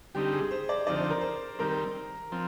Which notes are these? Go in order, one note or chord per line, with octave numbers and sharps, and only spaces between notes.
D3 G3 C4 D#4 G4
G#4
C5
D5
D3 F3 C4 D#4 D5
C5
A#4
C5
D#3 G3 C4 A#4
F3 C4